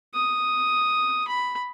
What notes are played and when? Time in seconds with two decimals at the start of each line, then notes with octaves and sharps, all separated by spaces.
0.14 D#6
1.28 B5